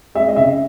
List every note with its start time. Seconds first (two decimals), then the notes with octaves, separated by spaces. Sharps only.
0.15 G#3 E5
0.28 D#5
0.36 C#3 E5